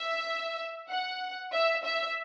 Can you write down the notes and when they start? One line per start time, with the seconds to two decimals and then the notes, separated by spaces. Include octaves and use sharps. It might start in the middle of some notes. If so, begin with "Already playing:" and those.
Already playing: E5
0.89 F#5
1.53 E5
1.85 E5